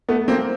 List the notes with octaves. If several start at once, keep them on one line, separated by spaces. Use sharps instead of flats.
A3 B3
A#3 C4